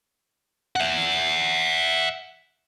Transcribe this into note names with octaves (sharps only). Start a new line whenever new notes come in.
E5 F#5